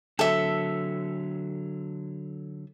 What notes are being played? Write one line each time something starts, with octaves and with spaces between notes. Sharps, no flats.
D3 F#3 A4 E5